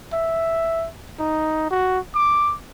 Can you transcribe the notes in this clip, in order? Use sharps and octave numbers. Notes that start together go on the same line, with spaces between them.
E5
D#4
F#4
D6